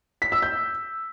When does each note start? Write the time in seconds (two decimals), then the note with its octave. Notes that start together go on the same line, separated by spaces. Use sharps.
0.22 B6
0.32 E6
0.43 G6